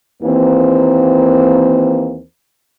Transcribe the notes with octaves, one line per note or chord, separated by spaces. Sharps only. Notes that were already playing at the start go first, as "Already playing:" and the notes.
D#2 E3 A#3 C4